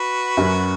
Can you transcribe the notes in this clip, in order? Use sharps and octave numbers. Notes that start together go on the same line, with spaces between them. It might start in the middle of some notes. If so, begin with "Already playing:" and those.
Already playing: F#4 B4
F#2 F#3 C#4